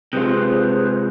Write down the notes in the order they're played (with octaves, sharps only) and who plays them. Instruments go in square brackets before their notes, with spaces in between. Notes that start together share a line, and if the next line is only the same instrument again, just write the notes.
[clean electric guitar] C3 G#3 F4 [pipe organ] G#4 B4 C5